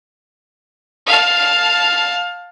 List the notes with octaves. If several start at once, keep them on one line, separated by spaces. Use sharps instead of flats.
F5 A5